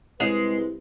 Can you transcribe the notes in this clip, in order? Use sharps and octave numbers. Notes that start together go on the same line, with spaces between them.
C2 G#3 B4